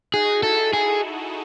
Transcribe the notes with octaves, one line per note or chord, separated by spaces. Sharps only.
D#4 F#4 G#4
E4 G#4 A4
F#4 G#4 A4